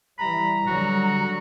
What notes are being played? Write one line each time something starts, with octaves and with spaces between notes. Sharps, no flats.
E3 G3 A#5 B5
D3 F#3 G3 F#4